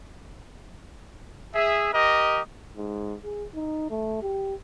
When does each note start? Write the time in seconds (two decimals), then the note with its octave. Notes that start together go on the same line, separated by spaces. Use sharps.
1.54 G#4 E5
1.91 G4 A#4 D#5
2.76 G#2
3.23 G#4
3.55 D#4
3.90 A3
4.22 G4